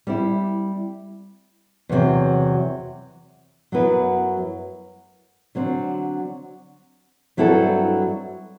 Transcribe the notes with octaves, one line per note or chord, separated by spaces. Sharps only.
G3 C4 E4
E2 C3 F#3
F#2 F#3 B3 E4 B4
D3 F#3 C4
G2 F#3 C4 E4 A4